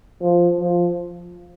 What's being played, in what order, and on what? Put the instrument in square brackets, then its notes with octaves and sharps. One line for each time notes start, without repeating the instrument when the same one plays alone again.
[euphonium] F3
F3